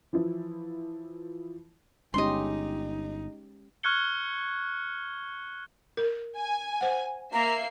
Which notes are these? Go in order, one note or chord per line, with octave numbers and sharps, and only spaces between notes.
E3 F3 E4
G1 G#3 C#4 D#4 G4 D#5 C6
C#6 F6 F#6 G#6 C#7 G7
A#4
G#5
C5 F#5
A#3 E5 A#5 C7